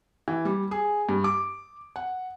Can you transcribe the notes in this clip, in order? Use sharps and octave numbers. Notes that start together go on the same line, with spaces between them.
E3
G3
G#4
G2
D6
F#5